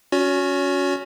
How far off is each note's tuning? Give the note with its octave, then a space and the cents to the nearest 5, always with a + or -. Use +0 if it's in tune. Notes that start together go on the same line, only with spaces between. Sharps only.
C#4 +10 F#4 -20 C#5 +30